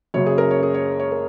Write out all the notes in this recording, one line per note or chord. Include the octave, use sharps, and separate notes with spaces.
F#1 F#2 C#3 F#3 C#5
G#4
A#4
C#5
G#4
C#5
C#5
A#4